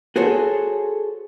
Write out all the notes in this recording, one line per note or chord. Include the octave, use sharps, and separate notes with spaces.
F#4 G#4 A4 C5 C#5